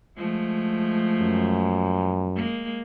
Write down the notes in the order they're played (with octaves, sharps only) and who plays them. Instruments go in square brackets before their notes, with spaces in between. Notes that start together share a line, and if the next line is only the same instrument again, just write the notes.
[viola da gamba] F3 G#3 A3
[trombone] F#2
[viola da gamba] G#3 A#3